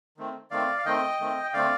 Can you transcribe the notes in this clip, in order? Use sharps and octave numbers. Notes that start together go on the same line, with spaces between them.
D#3 A3 C4
D#3 A3 C4 D5 F5
F5
D#3 A3 C4 D#5 G5
D#3 A3 C4
G5
D3 A3 C4 D5 F5